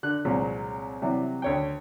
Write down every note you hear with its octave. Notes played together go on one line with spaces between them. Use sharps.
D3 F#6
C2 A#2 F#3 G#3
C3 E3 F#3 G3
D2 C#5 G5